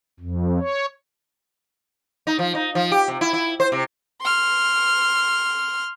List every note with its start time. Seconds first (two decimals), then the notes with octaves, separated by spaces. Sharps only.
0.20 F2
0.60 C#5
2.27 D#4
2.39 F3
2.55 D#4
2.75 F3
2.92 G4
3.08 C3
3.21 E4
3.33 E4
3.60 C5
3.72 C3
4.22 C6 F6